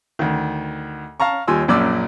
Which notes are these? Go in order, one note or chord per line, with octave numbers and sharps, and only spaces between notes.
D2 D#3
F5 A5 A#5 C#6
D#2 G3 F4 G#5 C6 E6
A#1 F#2 A#2 D5 D6 E6